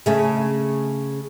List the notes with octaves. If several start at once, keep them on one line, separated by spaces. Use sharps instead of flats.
C#3 A3